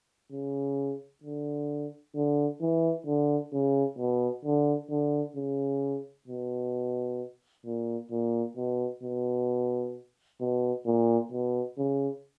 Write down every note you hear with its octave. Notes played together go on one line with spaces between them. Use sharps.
C#3
D3
D3
E3
D3
C#3
B2
D3
D3
C#3
B2
A#2
A#2
B2
B2
B2
A#2
B2
C#3